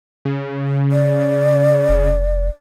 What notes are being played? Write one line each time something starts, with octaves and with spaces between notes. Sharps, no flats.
C#3
D5
F1